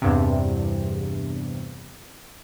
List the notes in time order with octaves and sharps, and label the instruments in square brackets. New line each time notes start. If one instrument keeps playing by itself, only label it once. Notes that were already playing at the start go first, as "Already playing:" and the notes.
[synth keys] E2 G2 C3